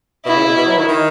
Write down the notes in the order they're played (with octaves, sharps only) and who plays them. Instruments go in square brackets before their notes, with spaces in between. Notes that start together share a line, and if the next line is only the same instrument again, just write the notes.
[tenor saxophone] B2 [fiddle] E4
[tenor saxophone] C#3
B2
B2
F#3
D#3
D#3